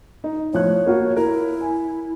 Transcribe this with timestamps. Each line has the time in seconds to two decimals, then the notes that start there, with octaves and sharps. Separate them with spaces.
0.24 D#4
0.53 A2 F3 C#5 F#6
0.86 A#3 F4 F#4
1.16 E4 A#4
1.61 G#5